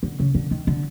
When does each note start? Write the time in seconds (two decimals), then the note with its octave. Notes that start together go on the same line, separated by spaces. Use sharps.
0.03 D3
0.20 C#3
0.35 D3
0.51 D#3
0.67 D3